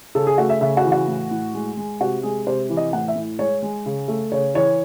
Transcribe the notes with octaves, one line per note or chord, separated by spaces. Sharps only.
C#3 A4
G#4
A3 F#4
E5
C#3 E5
F#4
E3
F#4
A2
A2
G#3
G#3
C3 F#4
G#3 G#4
C3 C5
E3
D#5
A2 F#5
E5
A2
G#3 C#5
G#3
C#3
A3
C#3 C#5
E3 C#5